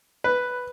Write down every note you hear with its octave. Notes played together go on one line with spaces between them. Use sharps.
B4